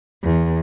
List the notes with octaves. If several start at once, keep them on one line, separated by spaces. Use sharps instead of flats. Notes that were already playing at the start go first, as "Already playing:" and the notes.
E2